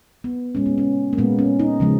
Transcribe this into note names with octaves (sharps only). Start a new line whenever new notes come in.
B3
A#2 G#3 C#4
B3
C#4
A#3
A#2 G#3 B3
C#4
D#4
C#3 F3 G#3